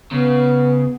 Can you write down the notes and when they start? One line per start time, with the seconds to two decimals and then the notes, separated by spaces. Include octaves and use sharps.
0.11 C#3 B3